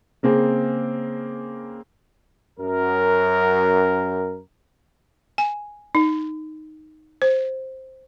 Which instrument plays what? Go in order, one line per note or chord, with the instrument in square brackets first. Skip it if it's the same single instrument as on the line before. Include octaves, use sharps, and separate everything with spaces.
[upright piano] C#3 A#3 C4 G#4
[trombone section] F#2 A#4
[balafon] G#5
D#4
C5